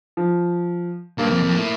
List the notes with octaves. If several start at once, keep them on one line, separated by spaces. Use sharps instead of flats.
F3
G2 A#3
F2
F2
A2